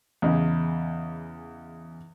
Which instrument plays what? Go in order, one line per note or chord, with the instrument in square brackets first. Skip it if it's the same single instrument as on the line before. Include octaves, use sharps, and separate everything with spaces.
[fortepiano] E2 C#3 D#5